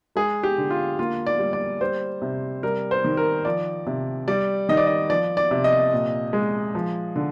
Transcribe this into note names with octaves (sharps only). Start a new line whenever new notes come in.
G#3 G#4
G4
D3
F4
A#3 F4
D5
G3
D5
G3 C5
C3
G3 A#4
C5
D#3
A#4
F3 D5
C3
G3 D5
D#3 D#5
D5
D#5
F3 D5
D5
C3
D#5
A#2
G#3
F3
D3